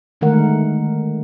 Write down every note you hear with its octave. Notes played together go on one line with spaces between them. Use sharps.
D3 D#3 G#3 A3 A#4 F#5